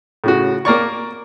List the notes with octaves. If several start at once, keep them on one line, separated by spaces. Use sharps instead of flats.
A2 C#3 F#4
A#3 A#4 D5 C#6